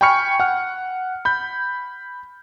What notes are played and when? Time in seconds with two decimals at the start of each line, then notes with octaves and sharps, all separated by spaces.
0.01 G5 G#5 B5 C#6 F6 C#7
0.40 F#5 F6
1.25 B5 G6